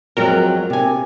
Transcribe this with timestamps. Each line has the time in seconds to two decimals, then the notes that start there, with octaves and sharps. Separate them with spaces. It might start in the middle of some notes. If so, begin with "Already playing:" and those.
0.17 F2 F#3 G#3 A#4
0.70 C3 G#5